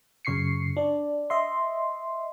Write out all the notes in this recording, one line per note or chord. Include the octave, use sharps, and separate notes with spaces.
F#2 C#3 C#6 C7 C#7
D4 D5
D#5 E5 C6